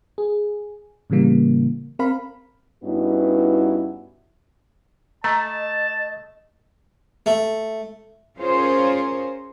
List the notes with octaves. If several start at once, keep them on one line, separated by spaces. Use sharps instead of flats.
G#4
A2 C#3 E3 G3 A#3
C4 A#4 F5 B5
G2 B3 C#4 D#4 E4 F#4
A3 D#5 A5 A#5
A3
C#4 F4 G#4 A#4 C5 C#5